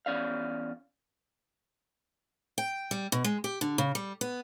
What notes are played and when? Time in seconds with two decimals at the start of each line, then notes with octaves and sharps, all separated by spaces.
0.06 E2 F#3 C#4 D5 F5
2.58 G5
2.91 G3
3.12 B2
3.24 G#3
3.44 G4
3.61 D3
3.78 C#3
3.95 G3
4.21 B3